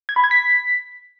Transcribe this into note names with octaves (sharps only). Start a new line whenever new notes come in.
G#6
B5
G#6
B6